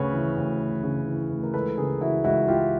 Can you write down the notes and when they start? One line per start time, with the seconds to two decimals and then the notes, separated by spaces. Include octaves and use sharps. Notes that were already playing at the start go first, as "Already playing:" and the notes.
Already playing: D2 C#3 B4 C#5
0.13 E3
0.37 D2
0.60 D2
0.83 C#3
1.07 E3
1.30 D2
1.43 A#4
1.54 C#2 A4 B4
1.77 C#3 G#4 A#4
2.00 E3 E4 F#4
2.24 C#2 E4 F#4
2.48 C#2 F4 G4